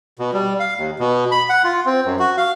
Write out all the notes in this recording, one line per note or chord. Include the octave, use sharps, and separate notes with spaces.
B2
G3
F5
D#2
B2
B5
F#5
F4
C4
F#2
F#4
F5